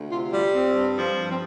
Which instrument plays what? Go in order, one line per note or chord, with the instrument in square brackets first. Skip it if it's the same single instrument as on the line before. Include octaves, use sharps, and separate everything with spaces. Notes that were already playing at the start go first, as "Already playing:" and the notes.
Already playing: [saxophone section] D2
C3 F4
G3 F4
C4
G2
F3
G2
C4